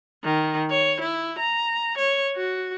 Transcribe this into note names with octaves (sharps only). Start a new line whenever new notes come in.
D#3
C#5
E4
A#5
C#5
F#4